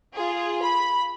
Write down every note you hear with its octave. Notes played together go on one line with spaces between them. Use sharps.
F4 G#4
B5